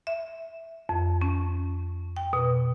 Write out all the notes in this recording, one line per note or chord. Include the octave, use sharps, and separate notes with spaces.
E5
F2
C#4
G5
B2